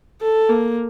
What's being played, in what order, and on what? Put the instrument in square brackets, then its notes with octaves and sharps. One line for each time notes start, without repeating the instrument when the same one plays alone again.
[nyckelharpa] A4
A#3